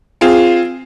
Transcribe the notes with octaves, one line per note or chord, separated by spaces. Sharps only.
C4 F4 G#4